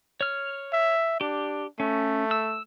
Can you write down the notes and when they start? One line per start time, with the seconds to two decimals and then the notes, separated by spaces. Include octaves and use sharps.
0.21 C#5 F6
0.73 E5
1.21 D4 G4
1.80 A3 C#4
2.31 E6